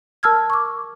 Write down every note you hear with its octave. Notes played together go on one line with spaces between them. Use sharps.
A#4 A5 E6 F6 G#6
C#6 D6